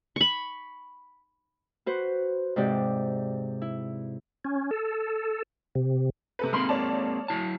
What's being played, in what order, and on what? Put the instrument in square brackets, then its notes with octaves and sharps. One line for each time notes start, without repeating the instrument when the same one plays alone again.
[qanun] B5 C#6
[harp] F#4 B4 C5
G#2 C3 G4 D5
E4
[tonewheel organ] C#4
A4
C3
[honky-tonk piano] C3 A4 B4
[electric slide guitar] G#3 A#3 C4 [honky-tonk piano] B5 C6 F6
[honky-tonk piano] C#5 D5 A5
[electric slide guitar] F#3 E4 A5